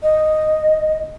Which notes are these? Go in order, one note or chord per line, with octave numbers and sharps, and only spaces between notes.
D#5